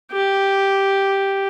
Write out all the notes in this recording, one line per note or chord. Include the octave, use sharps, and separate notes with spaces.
G4